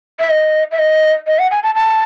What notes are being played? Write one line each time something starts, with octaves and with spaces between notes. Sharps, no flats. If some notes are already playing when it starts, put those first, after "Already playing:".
E5
D#5
E5
D#5
D#5
F#5
G#5
A5
A5